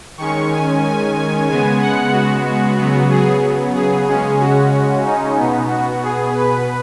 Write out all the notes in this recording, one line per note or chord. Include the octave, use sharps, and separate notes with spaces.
D#3 G#3 C#4 C#6
G#5
G#5
G#5
C#3 G#3 B3 G#5
F#5
F#4
F#4
C#3 F#3 B3
G#4
G#4
C#3 G#3 C#4
F#4
D#4
B2 B3
F#4
G#4
B4